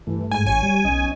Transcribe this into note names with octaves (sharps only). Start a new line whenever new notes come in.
G2 E3 A3
G#2 G#5
A1 C#5 G#5
G3
B1 C#4 D#5